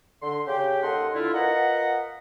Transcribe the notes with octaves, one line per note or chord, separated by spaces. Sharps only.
D3 C6
C#3 G4 G5
D#2 A4 D#5 F#5 C6
D3 E4 F4
F4 A#4 B4 D#5 F#5